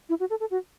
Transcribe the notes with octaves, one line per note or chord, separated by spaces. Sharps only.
E4
F#4
A4
A4
F#4